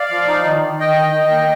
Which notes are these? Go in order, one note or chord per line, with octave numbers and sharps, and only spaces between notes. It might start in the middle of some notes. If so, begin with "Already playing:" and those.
Already playing: D5 F5
F3
D#4
D#3
D#3
D#3 D#5 G5
D#3
D#3
A#3